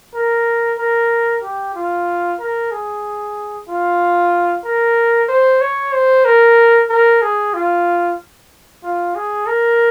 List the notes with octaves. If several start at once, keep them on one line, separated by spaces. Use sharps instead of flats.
A#4
A#4
G4
F4
A#4
G#4
F4
A#4
C5
C#5
C5
A#4
A#4
G#4
F4
F4
G#4
A#4